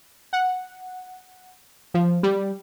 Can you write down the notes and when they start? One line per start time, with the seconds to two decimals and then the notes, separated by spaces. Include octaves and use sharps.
0.33 F#5
1.94 F3
2.23 G3